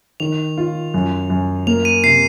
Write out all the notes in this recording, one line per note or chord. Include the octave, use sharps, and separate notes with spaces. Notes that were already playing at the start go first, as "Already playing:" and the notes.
D#3 F7
F4
F#2
F#2
A#3 F7
D#7
C3 C7